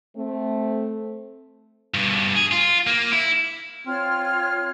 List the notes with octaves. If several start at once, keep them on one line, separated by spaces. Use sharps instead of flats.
A3 C4
G2 B2
G#4
F4
A#3
E4
C4 F4 C#5 F6